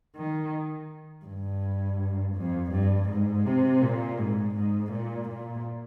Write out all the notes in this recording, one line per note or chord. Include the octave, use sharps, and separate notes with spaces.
D#3
G2
F2
G2
G#2
C3
A#2
G#2
G#2
A#2
A#2